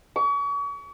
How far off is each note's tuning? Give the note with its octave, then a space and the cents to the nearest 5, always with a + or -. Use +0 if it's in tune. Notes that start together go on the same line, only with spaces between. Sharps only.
C#6 +40